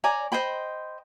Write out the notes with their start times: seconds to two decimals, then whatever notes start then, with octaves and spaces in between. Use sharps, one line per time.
0.04 C#5 D5 G#5 A#5
0.32 C5 D#5 G5 B5